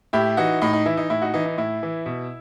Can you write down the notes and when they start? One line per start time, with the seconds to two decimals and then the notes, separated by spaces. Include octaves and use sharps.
0.13 A2 E4 G4
0.37 E3 D#4 F#4
0.62 A2 D#4
0.73 D#4
0.86 E3 E4
0.97 D#4
1.10 A2 E4
1.22 D#4 F#4
1.34 E3 D#4
1.46 D#4
1.57 A2 E4
1.83 E3
2.06 B2